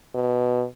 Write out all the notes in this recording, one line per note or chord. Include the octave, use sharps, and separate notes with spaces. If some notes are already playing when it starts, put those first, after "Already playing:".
B2